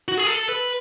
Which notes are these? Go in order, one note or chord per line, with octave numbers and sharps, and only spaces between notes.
F#4
G#4
A4
B4